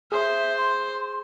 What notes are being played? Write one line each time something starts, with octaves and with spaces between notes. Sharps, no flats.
G#4 C5 E5
C6